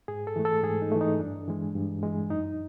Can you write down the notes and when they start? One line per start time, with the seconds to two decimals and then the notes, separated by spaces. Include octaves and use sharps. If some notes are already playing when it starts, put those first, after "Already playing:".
0.08 G#2 G#4
0.27 A4
0.36 E3 A3
0.45 A4
0.64 G#2 G#4
0.82 D#4
0.92 E3 A3
1.01 D#4
1.19 G2 D4
1.47 E3 G#3
1.75 G2
2.03 E3 G#3
2.30 F#2 D#4